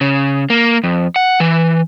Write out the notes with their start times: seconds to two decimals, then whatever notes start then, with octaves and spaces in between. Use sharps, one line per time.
0.01 C#3
0.50 A#3
0.84 F2
1.16 F#5
1.40 E3